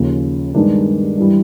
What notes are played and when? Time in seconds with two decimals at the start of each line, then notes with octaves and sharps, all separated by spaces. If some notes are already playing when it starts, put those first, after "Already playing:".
Already playing: D#2 C#3 F3
0.54 G2 D#3 G#3 B3 D4
1.18 G2 E3 G3